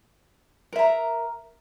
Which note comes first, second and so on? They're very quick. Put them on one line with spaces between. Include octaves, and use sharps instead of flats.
A#4 E5 A#5